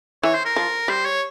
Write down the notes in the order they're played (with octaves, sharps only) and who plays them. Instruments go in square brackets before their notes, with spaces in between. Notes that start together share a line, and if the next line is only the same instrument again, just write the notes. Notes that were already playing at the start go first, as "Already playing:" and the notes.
[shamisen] E3 [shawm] C#5
[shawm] C5
A#4
[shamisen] F3
[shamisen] G3 [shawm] C5
[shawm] C#5